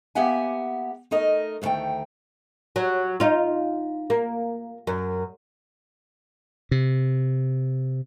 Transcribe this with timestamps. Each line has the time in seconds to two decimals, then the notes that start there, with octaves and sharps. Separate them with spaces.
0.15 A#3 B3 G4 E5 F#5 G#5
1.11 A3 D#4 A#4 D#5
1.62 D2 C3 D#3 A3 G5
2.76 F#3
3.20 D#4 F4
4.10 A#3
4.87 F#2
6.71 C3